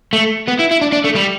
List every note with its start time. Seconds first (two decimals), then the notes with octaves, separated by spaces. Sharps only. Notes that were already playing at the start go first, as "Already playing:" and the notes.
0.13 A3
0.48 B3
0.59 E4
0.71 E4
0.81 D4
0.93 D4
1.05 A3
1.16 G3